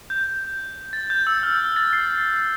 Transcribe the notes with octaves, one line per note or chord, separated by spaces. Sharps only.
G6
A6
G6
E6
F6
A6
C7